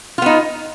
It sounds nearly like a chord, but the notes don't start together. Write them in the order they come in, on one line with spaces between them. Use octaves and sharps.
F4 B3 D#4